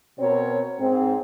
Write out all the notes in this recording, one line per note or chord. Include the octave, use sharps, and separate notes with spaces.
B2 C4 A#4 C#5
G#2 C4